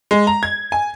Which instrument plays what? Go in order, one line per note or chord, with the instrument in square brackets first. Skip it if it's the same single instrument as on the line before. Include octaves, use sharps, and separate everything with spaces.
[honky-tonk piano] G#3
A#5
G#6
G#5